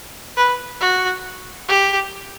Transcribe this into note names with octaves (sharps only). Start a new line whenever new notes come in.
B4
F#4
G4